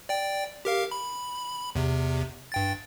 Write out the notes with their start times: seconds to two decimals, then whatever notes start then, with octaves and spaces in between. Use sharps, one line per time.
0.09 D5 G5
0.65 G4 A#4 F5
0.91 B5
1.75 E2 C3
2.52 G2 G5 A6